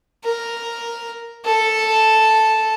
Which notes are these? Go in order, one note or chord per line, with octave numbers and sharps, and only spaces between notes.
A#4
A4